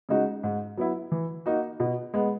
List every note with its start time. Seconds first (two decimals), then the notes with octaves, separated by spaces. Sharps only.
0.09 C#3 G#3 D#4 F#4
0.43 G#2
0.77 F#3 B3 E4
1.12 E3
1.46 A#3 D#4 F#4
1.80 B2
2.14 G#3 B3